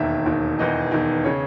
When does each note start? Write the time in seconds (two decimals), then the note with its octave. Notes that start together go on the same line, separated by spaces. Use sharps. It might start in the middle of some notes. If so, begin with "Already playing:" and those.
Already playing: E1 D#2 D#3 E5
0.25 E1 D#2 D#3
0.59 E1 E2 D#3 D#5
0.91 E1 E2 D#3
1.24 C#3 C#5